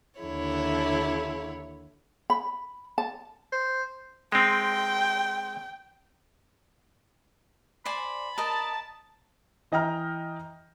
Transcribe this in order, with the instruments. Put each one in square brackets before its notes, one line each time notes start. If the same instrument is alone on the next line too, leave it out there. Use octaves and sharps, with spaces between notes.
[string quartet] D#2 D3 E4 C#5
[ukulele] B5
A5
[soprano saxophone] C5
[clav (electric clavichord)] G#3 C4 [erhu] G5
[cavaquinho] C5 D5 G#5 [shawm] B5
[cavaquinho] A#4 D#5 [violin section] A5
[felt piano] E3 D#5 G5 A#5 F6